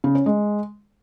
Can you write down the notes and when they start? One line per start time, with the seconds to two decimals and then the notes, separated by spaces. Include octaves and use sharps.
0.04 C#3
0.15 C#4
0.26 G#3